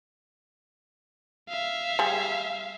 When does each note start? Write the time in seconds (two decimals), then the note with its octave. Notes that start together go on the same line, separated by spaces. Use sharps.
1.49 E5 F5
1.99 G3 G#4